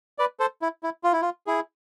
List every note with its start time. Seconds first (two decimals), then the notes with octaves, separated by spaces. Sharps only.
0.18 B4 D5
0.40 A4 C5
0.62 E4
0.83 E4
1.04 F4
1.13 E4
1.22 F4
1.47 E4 G#4